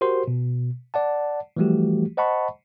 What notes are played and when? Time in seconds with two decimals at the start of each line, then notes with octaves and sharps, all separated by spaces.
0.01 F#4 G4 A#4 C5 C6
0.28 B2
0.94 D5 F#5 A5
1.57 E3 F3 G3 A3 F#4 G4
2.17 C5 D#5 F#5 A5 B5 C#6